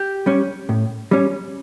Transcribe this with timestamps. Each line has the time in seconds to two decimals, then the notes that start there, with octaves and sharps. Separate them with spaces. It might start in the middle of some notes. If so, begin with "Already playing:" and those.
Already playing: G4
0.26 G3 C#4
0.69 A2
1.11 G3 C#4